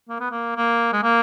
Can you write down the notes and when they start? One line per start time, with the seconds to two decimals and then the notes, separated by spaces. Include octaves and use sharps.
0.09 A#3
0.20 B3
0.31 A#3
0.56 A#3
0.93 G#3
1.03 A#3